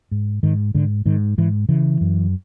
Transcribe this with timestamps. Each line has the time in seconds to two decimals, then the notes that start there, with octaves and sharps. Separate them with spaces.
0.11 G#2
0.43 G#2 D#3
0.75 G#2 D3
1.06 G#2 D#3
1.38 G#2 E3
1.69 C#3 E3
2.01 F#2